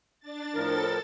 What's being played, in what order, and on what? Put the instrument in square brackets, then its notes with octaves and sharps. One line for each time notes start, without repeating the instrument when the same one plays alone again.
[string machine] D4 A6
[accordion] A2 F3 A#4 [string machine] A4 A6